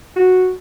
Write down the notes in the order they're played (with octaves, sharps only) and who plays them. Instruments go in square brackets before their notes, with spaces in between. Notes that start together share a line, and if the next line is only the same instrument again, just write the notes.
[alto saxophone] F#4